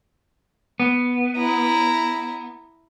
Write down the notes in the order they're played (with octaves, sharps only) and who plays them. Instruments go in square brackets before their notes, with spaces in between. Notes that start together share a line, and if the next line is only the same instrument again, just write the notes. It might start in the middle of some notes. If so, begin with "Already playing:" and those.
[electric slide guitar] B3
[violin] E4 A#5